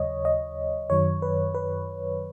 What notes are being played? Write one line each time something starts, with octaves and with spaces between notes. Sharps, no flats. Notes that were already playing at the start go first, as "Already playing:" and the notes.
Already playing: D#2 C#3 F#3 C#5 D#5
D#5
F#2 D#3 F#3 C#5
B4
B4